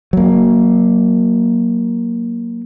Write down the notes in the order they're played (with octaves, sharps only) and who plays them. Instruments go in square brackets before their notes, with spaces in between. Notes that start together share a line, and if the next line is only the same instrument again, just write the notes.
[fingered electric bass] F#3 A#3